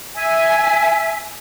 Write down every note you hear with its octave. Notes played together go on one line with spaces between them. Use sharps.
E5 G#5